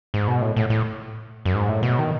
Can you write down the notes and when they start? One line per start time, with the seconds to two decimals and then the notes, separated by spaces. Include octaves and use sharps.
0.14 G#2
0.28 B2
0.42 A2
0.56 A2
0.70 A2
1.45 F#2
1.54 G#2
1.69 A2
1.83 B2
1.99 D#3